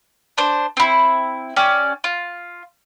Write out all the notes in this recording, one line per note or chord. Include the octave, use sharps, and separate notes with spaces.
D4 C5
C4 E4
C#4 G4 D5
F4